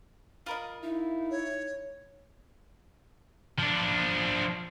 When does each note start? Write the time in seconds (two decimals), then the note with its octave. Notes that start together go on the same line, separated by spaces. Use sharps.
0.46 F4 A#4 D#5 B5
0.82 D#4 E4
1.31 C#5
3.58 F3 D4